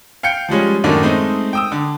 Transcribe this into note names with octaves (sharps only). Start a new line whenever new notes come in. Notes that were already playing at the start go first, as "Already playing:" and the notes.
F5 G5 G6 C#7
F3 G3 G#3 C#4
F#2 A2 D#3 A3 D4 D#4
G#3 A3 C4 D#4
G5 D#6 E6
D3